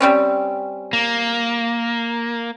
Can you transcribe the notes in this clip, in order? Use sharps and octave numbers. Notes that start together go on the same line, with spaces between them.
G3 C4 C#4
A#3